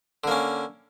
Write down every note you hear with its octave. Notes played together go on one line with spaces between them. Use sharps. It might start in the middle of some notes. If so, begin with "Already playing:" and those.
D3 A#3 C#4